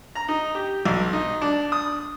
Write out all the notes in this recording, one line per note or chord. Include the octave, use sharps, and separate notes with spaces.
A#5
D#4
G4
B1
D#4
D4
D#6